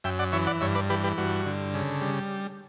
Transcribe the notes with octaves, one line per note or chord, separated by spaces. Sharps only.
F#2 E5 G5
D5 F#5
E3 C#5 E5
D5 F#5
G2 C#5 E5
B4 D5
E3 G4 B4
G4 B4
G2 F#4
D3
C#3
G3